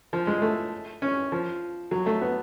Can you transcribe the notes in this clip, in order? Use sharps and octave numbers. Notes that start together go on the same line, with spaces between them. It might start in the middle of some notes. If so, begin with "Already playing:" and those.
F3
G#3
A3
C#4
F3
F#3
A3
B3